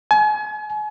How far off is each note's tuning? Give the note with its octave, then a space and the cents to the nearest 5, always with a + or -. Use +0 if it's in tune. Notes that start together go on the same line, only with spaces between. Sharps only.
G#5 +35